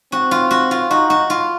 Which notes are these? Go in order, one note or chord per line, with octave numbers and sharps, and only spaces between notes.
C4 F#4
F4
F#4
F4
D#4 F#4
F#4
F4